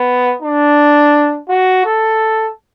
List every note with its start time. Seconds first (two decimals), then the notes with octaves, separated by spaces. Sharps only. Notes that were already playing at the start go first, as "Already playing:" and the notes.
Already playing: B3
0.42 D4
1.49 F#4
1.85 A4